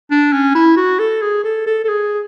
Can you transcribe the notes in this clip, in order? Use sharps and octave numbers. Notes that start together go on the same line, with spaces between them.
D4
C#4
E4
F#4
A4
G#4
A4
A4
A4
G#4